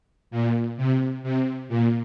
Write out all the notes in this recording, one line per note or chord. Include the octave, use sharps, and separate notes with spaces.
A#2
C3
C3
A#2